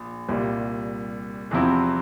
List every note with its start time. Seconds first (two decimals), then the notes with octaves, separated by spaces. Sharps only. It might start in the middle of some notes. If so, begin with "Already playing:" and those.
Already playing: A#1
0.29 C2 A#2 G3
1.51 E2 C3 F3 C4 E4